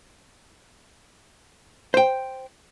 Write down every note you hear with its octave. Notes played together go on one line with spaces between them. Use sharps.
C5 G5